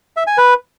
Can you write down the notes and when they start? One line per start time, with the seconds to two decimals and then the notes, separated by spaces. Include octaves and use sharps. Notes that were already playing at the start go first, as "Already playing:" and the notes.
0.17 E5
0.27 G#5
0.38 B4